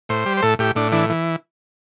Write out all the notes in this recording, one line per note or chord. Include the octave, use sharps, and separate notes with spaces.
A2 C5
G3
C5
A2 A4
A2 G4
A2 D4
E3 D4
E3